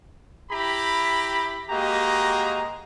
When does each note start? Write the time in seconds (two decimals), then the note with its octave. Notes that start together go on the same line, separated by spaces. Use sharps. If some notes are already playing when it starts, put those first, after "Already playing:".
0.50 E4 G4 A#5 B5
1.69 G#3 A#3 F#4 G4 D#5 A#5